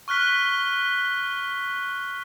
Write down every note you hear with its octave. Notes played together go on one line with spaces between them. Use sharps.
C#6 F6 F#6 B6 G7